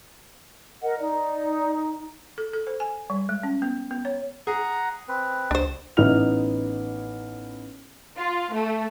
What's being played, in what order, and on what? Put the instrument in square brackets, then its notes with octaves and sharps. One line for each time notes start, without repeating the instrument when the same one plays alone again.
[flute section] A#4 D#5 F#5
[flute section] D#4 [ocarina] D5
[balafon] A4
A4
C5
G#5
G3
G#3
C#4
B3
B3
C#5
[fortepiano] G#4 [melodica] F#5 A#5
[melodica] C4 B4
[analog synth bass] C#2 [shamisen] D4 C5
[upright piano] A1 B3 D#4 E4 F6 F7
[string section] F4
A3